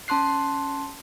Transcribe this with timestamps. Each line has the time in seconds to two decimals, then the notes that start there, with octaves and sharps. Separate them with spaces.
0.08 C#4 A5 C6 F#6 C7